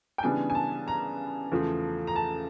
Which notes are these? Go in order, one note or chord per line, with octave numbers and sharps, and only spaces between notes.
G5
C#3 E3 G3 B3 D4 G#5
G#5
A5
A#5
E2 C#3 F3 A3
A#5
A5